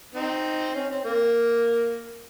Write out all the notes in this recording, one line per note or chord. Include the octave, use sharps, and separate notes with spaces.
C4 D#4
C#4
C4
A#3